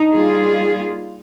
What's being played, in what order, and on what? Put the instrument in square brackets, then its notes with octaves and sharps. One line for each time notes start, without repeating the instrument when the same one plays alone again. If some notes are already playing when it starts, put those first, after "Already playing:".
Already playing: [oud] D#4
[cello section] G3 A#3 F4 G#4